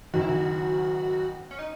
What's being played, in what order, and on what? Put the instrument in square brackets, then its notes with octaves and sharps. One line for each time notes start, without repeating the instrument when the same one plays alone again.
[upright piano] F#1 F#2 D#3 F#3 [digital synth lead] F#4
[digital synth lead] E4
F#4
C#4
D#4